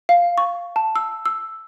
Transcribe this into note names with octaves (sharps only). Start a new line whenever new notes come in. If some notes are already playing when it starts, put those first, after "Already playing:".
F5
C#6
A5
E6
E6